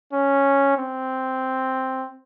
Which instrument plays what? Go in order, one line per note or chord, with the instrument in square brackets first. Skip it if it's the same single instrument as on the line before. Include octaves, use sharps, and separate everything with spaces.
[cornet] C#4
C4